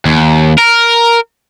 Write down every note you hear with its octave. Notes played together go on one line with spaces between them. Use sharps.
D#2
A#4